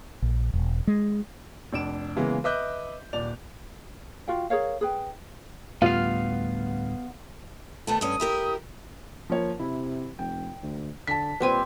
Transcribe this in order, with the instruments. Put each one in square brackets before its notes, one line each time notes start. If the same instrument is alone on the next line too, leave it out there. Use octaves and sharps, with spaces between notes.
[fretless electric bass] A#1
E1
G#3
[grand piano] F1 D4 D7 E7
C#3 E3 G#3 A#3 B3
B4 D#5 E5 D6 F#6 G6
D#1 D5 F7
[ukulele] F4 F#4 F5 G5
G#4 A#4 C#5 F5
G#4 B4 G5
[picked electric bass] D2 A2 G3 [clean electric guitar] B3 F5 [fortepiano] F4
[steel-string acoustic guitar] D#2 A3 B3 [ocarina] A5
[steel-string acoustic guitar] G2 C#4 [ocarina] D#6
[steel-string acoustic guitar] E4 G4 A#4
[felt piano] F3 A#3 C#5
[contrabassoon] C3 [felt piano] E4
[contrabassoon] F1 [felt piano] G5
[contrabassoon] D2
[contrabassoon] D3 [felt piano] A5 B6
[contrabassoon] A#2 [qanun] G3 C4 G#5 [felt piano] B4